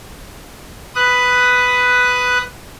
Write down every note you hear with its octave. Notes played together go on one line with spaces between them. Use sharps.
B4 D#6 F#6